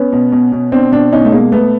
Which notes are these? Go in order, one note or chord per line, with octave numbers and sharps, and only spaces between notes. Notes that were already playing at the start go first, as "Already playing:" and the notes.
Already playing: B3 C#4
B2
B2
B2
B2 C4 D4
B2 C4 D4
B2 C#4 D#4
A3
B2 G#3 A#3
B2 A3 B3